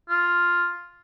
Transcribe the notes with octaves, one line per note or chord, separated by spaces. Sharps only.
F4